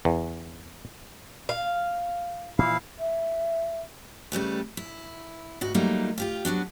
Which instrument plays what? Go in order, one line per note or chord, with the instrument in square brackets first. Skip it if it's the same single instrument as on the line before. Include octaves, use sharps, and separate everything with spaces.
[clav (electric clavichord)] E2
[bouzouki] F5
[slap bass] A#2 E3 F3 [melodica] E4 F5
[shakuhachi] E5
[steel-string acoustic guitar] C#3 G3 A3 B4
E4
D2 G#2 F#4
F#3 G3 A3 A#3 D#4 F4
F4 G4 F5
F#3 B3 D4 F#4